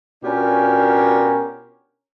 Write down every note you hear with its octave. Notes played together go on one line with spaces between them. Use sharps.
B2 C#4 D4 F4 G4 A#4